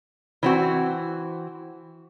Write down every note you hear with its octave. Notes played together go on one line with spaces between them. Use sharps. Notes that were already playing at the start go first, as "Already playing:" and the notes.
E3 C4 F#4